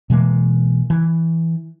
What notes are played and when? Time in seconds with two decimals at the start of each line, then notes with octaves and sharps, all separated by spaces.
0.10 B2 E3 G#3 A#3
0.90 E3